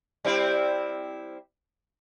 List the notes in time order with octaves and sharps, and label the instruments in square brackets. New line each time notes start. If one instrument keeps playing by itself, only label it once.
[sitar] G3 C4 E4